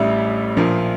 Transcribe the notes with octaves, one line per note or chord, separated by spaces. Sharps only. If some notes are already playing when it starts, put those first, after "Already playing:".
Already playing: A1 A2 G3 D5 E5
A#1 A#2 F3 A#3